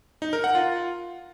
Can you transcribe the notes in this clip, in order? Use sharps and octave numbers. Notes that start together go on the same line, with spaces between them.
D#4
A#4
F#5
F4